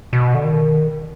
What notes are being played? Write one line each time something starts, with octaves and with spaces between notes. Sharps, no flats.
B2
D3
D#3